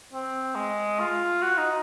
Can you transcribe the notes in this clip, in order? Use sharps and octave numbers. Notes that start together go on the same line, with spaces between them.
C4
G#3
F4
F#4
D#4